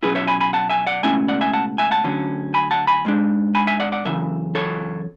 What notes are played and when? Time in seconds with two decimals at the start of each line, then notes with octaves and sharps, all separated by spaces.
0.03 B2 F#3 C#4 E4 G#4 B4
0.15 C#5 E5
0.27 G#5 B5
0.40 G#5 B5
0.53 F#5 A5
0.69 E5 G#5
0.87 D5 F#5
1.03 C#2 B2 A3 C#4 E4 E5 G#5
1.28 D5 F#5
1.41 E5 G#5
1.53 F#5 A5
1.78 E5 G#5
1.91 F#5 A5
2.04 D2 D3 F#3 C#4
2.54 G#5 B5
2.71 F#5 A5
2.87 G#5 B5
3.05 G#2 G#3 D4
3.55 G#5 B5
3.67 E5 G#5
3.80 D5 F#5
3.92 D5 F#5
4.05 F#2 C#3 E3 E5
4.55 A4 C#5